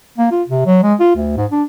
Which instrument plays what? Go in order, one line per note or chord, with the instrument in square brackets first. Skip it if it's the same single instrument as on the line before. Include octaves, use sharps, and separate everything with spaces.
[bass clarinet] A#3
F4
C3
F#3
G#3
F4
D2
G#2
D4